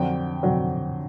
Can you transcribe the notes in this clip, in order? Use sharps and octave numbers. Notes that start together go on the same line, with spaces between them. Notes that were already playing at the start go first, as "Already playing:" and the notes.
Already playing: F2 D3 F#3 G5
F2 D3 F#3